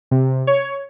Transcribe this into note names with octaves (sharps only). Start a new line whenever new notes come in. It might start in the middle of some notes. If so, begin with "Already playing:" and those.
C3
C#5